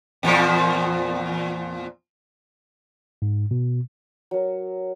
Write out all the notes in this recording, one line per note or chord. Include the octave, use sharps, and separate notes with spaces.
E2 A#2 F3
G#2
B2
F#3 A#4